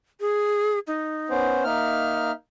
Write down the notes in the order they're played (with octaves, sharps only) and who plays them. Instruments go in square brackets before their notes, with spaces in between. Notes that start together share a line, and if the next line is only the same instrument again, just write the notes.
[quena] G#4
D#4
[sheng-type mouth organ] B3 C#4 C5
[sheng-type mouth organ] A#3 D#4 F6 [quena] E5